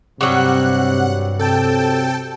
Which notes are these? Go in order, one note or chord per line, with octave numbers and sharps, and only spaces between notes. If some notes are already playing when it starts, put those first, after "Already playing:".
G2 C3 F#3 G3 F#5 F#6
C3 A4 G5 A5